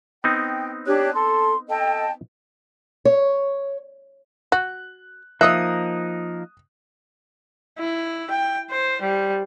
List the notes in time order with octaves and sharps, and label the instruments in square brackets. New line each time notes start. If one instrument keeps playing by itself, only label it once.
[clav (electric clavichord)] B3 C4 D#4 [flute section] G5
[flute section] D4 G4 F#6 [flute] C#5
[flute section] A4 [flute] C6
[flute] A4 [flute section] D#5 G5 A5
[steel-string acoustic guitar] C#5
[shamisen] F#4 [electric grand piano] F#6
[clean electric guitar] F3 A#3 D#4 [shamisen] D#5 E5 [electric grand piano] D#6 F#6
[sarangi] E4
G5
C5
G3